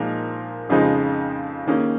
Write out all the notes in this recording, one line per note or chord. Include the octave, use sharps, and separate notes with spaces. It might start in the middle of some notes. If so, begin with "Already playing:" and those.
Already playing: A#2 F3 G#3 D#4 A#4
F2 C#3 F3 G#3 D#4
D#3 A#3 C#4 G#4